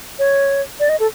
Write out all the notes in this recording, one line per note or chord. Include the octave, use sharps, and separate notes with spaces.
C#5
D5
D#5
A4